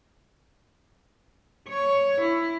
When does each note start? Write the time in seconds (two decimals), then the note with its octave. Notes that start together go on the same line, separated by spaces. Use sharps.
1.69 C#5
2.21 E4